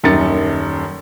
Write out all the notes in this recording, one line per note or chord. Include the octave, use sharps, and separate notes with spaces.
D#1 F#2 D#3 A6 C#7